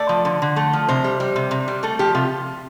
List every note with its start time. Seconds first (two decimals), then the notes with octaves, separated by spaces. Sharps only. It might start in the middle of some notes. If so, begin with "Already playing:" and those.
Already playing: A3 D5
0.09 F3
0.25 D3
0.42 D3
0.56 A3
0.73 F3
0.88 C3 C5
1.04 G3
1.20 G3
1.36 C3
1.51 C3
1.68 G3
1.83 A3 A4
1.99 F3 G4
2.15 C3 F4